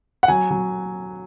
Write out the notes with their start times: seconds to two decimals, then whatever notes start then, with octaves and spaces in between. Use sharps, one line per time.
0.23 F#5
0.28 F#3 G#5
0.51 F#3